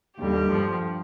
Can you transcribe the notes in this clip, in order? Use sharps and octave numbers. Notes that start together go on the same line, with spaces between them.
D#2 D3 G3 G4
G2 F3